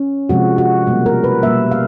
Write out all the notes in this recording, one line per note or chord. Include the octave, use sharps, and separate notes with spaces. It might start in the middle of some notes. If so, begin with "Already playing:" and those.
Already playing: C#4
C3 F3 G#3 F#4
F#4
B2 G3 A#3
A#4
B4
B2 G3 A#3 E5
F5